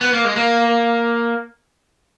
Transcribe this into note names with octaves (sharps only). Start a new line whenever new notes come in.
B3
A#3
G#3
A#3